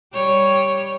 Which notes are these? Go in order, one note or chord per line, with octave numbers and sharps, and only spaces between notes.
G3 C#5